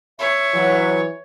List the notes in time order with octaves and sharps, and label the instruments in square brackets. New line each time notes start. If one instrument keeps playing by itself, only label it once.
[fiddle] C#5 [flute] E5
[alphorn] E3 [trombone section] F#3